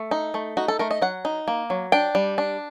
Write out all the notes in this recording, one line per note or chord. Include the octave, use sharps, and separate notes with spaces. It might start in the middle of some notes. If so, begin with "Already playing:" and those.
Already playing: A3
D#4
A3
D#4 F#4
A4
A3 A#4
D#5
F#3 F#5
D#4
A#3
F#3
D4 G5
G3
D4